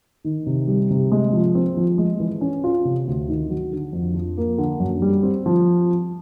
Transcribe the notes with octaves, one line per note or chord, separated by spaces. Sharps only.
D#3
C3
G3
C3
G#3
F3
C4
F3
G#3
E3
C#4
F4
C3
D2
D#3
F#3
D3
F2
F3
A#3
D3
F#2
G3
C4
F3